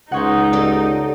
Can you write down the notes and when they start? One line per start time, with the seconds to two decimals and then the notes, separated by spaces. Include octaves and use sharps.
0.12 C#2 D#4 C5 C#5 F#5
0.53 G4 A4 D5